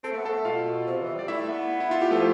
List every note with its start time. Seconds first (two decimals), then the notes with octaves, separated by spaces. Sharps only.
0.04 C4 A4 A5
0.11 A3
0.18 B3
0.25 A4 A5
0.32 A3
0.45 B2 F4 F5
0.87 C3
1.02 E3
1.14 G3 D5
1.28 A3 E4 E5
1.49 B3
1.80 E4
1.91 F4
2.02 G4
2.11 F3 A3 A4